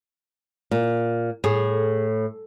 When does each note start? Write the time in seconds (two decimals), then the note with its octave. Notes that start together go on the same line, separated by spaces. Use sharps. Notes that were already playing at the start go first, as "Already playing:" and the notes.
0.71 A#2
1.44 A2 G#4